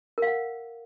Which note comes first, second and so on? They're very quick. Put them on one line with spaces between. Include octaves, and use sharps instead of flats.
A#4 F5 F#5